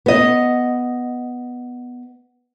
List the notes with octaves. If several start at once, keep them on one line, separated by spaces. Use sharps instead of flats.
B3 D#5